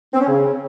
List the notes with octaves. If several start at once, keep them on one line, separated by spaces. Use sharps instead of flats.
C4
C#4
C#3